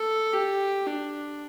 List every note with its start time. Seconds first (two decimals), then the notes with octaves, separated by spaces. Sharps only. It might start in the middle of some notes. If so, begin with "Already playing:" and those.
Already playing: A4
0.33 G4
0.86 D4